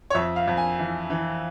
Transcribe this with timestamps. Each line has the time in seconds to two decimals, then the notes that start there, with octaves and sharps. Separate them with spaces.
0.10 C#5
0.15 F2 E5
0.36 F5
0.48 F2
0.57 G#5
0.79 E3
1.10 E3